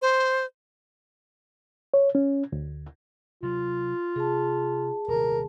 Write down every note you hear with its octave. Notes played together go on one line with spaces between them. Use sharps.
C5
C#5
C#4
D2
C3 F#3 F4
C3 G#4 A5
D#1 C3 A#4